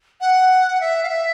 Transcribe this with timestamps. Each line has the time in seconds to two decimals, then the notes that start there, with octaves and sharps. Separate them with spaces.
0.21 F#5
0.80 E5
1.03 F5
1.09 E5